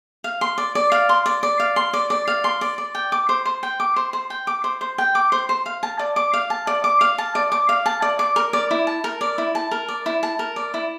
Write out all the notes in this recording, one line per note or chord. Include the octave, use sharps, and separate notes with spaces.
F5
C6
D5
D5
F5
C6
D5
D5
F5
C6
D5
D5
F5
C6
D5
D5
G5
D6
C5
C5
G5
D6
C5
C5
G5
D6
C5
C5
G5
D6
C5
C5
F5
A5
D5
D6
F5
A5
D5
D6
F5
A5
D5
D6
F5
A5
D5
D6
A#4
D5
E4
A5
A#4
D5
E4
A5
A#4
D5
E4
A5
A#4
D5
E4